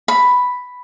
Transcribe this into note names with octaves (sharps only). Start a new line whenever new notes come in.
B5